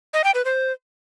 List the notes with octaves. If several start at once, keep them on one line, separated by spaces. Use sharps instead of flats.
D#5
G5
B4
C5